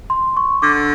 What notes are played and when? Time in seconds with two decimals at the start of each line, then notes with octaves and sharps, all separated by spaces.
0.10 C6
0.37 C#6
0.62 D3 D6